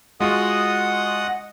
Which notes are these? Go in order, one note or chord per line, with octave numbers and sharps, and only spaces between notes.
G#3 F4 F#4 D#5 F#5 D#6